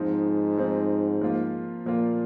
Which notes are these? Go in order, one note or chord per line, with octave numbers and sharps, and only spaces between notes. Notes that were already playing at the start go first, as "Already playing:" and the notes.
Already playing: G#2 F3 C4 D#4
F3 C4 D#4
F3 A#3 F4
A#2 F3 A#3 F4